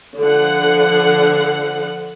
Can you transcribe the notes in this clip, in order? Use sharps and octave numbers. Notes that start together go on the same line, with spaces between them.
D3 F3 F#5